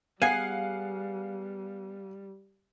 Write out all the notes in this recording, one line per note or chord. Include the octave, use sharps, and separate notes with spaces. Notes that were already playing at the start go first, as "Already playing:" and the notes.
G3 B3 G#4 F5 F#5 G#5 C7